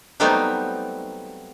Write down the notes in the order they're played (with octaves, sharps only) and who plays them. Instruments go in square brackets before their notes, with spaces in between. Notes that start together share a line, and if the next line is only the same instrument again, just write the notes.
[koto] F#3 G3 A3 B3 C4 D#4